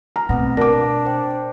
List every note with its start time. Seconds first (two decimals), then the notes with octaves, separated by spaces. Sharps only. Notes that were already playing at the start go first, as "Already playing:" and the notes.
0.16 A#5 F6
0.29 B2 A3 B3 C4 A#6
0.57 D4 A#4 D6 A#6
1.05 C5 G5